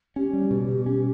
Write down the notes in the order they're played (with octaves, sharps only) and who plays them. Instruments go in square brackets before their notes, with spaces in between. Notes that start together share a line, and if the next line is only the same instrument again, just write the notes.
[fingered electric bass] C#4 [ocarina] G4
[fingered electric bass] G3
B2
B2
C#4